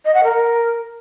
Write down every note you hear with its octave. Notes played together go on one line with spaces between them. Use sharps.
D#5
F#5
A#4